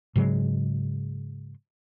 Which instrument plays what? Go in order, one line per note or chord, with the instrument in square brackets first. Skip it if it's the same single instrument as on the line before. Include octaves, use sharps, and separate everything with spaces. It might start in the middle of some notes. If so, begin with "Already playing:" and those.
[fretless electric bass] G#2 C#3 F#3 G#3